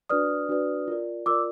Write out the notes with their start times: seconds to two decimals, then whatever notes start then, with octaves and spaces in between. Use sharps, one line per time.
0.10 D4 F#4 B4 D5 D#6 F6
0.49 D4 F#4 B4 D5
0.88 F4 A#4 D5
1.26 F4 A#4 D5 D6 E6